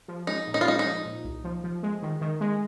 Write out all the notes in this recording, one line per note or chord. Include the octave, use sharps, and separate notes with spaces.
F3
G#3 D#4
A#2
D#4
F4
G#3 D#4
D#4
F3
A#2
C2
F3
F3
G#3
D#3
D#3
G#3